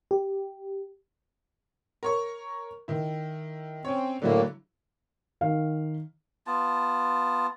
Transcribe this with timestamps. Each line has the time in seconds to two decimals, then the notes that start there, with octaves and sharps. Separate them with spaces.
0.11 G4
2.03 A#4 C#5 C#6
2.88 D#3 E4
3.85 C4 C#4 C#5
4.22 A2 D3 F#3 A#3 E4
5.41 D#3 F5
6.47 B3 F4 A5